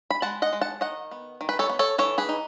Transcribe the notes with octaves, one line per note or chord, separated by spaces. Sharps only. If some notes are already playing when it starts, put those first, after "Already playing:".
B5
G#3 F#5 A5
D#5 F#5
G#3
F#5 A5
D#3 D#5 F#5
B3
D#3
B4
A4 C#5
B3
A4 C#5
E3 A4 C#5
G#4 B4
D#4